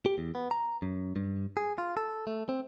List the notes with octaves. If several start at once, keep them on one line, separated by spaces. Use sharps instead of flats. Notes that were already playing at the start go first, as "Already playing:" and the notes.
G4
E2
B3
A#5
F#2
G2
G#4
F4
A4
A3
C4